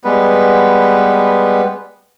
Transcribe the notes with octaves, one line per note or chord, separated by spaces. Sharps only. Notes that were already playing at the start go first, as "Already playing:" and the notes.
G3 G#3 B3 B4